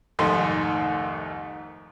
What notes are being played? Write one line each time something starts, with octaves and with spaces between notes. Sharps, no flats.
C2 F2 G#2 D#3 A3 C6